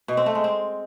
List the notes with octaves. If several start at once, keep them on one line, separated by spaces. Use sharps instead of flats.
B2
C4
A3
G#3
C4